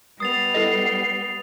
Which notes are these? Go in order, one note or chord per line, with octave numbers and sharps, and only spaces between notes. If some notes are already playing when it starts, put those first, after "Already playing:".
G3 B3 D#6 A6 C7 F7
E4 A4 D#5